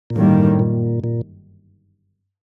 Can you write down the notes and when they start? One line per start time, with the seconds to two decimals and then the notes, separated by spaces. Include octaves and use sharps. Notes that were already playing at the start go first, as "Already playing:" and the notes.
0.10 A#2
0.16 G1 F#2 A2 D#3 G3 A#3
0.59 A#2
1.04 A#2